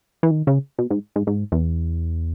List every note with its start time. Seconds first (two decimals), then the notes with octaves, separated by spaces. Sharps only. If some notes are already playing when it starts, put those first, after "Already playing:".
0.23 E3
0.31 D#3
0.47 C#3
0.78 B2
0.90 G#2
1.16 G#2
1.27 G#2
1.52 E2